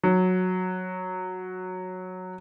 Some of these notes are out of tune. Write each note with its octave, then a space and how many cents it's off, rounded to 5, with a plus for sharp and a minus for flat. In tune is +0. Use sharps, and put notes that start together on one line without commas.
F#3 -10